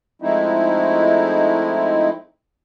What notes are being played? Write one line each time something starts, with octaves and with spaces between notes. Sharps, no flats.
F3 G#3 A3 C4 D#4 E4